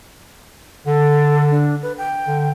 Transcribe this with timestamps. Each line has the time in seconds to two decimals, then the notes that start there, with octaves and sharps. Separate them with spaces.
0.87 D3 A4
1.51 D4
1.82 B4
1.98 G5
2.27 D3